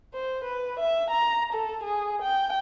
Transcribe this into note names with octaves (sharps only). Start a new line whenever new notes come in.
C5
B4
E5
A#5
A4
G#4
G5